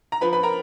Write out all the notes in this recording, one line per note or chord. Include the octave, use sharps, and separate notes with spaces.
A#5
F3 B4 B5
B4 B5
A#4 A#5